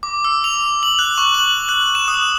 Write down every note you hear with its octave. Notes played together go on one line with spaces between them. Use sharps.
D6
E6
F7
F#7
F#6
C#6
F#7
F#6
E7
D#6